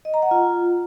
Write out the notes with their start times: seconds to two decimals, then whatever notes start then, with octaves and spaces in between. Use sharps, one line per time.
0.05 D#5
0.14 A#5
0.22 F#5
0.31 F4